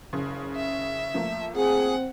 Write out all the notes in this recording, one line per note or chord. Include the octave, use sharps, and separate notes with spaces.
F#1 C#3
E5
F3 A3 A#3
C4 G#4 F#5